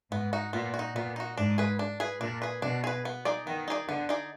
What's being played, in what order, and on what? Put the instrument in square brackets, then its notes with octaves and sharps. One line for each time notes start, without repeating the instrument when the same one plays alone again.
[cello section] G#2 [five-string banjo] B3
[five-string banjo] D#4 F#4
[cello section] A#2 [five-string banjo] B3
[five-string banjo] F#4
D#4
[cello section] A#2 [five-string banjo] B3
[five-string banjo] D#4 F#4
[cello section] G#2 [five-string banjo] D4
[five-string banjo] G#4 B4
D4
G#4 B4
[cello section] A#2 [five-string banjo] D4
[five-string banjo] G#4 B4
[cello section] B2 [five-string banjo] D4
[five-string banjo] G#4 B4
B3
D#4 G#4 D5
[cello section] D#3 [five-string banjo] B3
[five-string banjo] D#4 G#4 D5
[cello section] D3 [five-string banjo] B3
[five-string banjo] D#4 G#4 D5